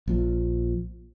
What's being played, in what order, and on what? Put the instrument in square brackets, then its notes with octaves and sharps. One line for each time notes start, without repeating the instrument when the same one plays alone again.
[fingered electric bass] A#1 A#2 F3